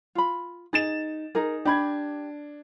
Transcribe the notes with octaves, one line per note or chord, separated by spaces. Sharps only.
F4 B5
D#4 G#4 A6 E7
D#4 G#4 A#4
D4 G4 B5 G#6